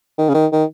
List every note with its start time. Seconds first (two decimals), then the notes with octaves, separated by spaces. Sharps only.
0.18 D#3
0.29 C#3
0.34 D#3
0.52 D#3